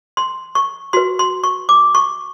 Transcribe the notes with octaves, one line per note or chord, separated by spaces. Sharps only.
C6
C#6
F#4 B4 C6
C6
C#6
D6
C#6